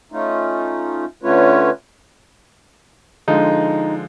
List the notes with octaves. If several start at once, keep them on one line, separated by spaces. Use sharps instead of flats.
A3 C#4 D#4 F4
D3 A3 C#4 F4 B4 C#5
D3 F3 G#3 D#4